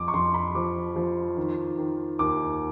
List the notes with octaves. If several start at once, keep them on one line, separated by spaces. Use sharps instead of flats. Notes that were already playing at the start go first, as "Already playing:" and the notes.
Already playing: F2 D6
C#6
F2 C6
B5
F3 D6
F3
D#3
D#3
D#2 D6